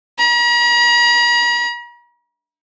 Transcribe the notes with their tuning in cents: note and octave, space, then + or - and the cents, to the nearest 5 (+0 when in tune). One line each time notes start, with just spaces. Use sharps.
A#5 +45